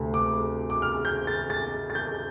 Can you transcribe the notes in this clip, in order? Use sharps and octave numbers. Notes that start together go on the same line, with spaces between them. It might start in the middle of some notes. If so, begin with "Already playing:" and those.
Already playing: D2 C3 A3
D6
D6
F6
G6
A6
A6
A6
G6